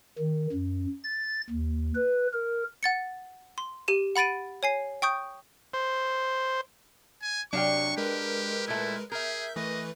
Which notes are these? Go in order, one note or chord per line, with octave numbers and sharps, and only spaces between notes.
D#3
F#2
A6
D#2
B4
A#4
F#5 A6 C#7
C6
G4 D#7 E7
F#5 B5 A6 D7 D#7
C#5 G#5 C7
G5 C#6 D#6 G6
C5
G#5
C3 F#3 D4 F5 G5 C#6
G#3 G4 A#4 B4
A#2 A3 E4
G#4 A#4 E5 G6
E3 A3 B4 D#5